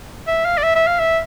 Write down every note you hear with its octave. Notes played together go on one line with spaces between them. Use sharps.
E5
F5
D5
E5
E5
F5
E5